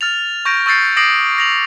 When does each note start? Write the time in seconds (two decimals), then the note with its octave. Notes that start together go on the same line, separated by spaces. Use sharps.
0.01 F6 A6 F7
0.45 C#6 G6 A#6 D7
0.66 C#6 E6 G6 A6 C7 C#7
0.96 D6 D#6 A#6 C7 D7 F#7
1.38 A#6 F7 F#7